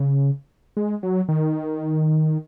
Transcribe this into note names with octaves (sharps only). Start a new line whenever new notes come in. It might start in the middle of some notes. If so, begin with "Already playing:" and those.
Already playing: C#3
G#3
F#3
D#3